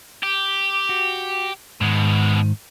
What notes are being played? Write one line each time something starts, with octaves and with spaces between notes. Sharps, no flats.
G4
F#4
G#2 B2 D#3 G#3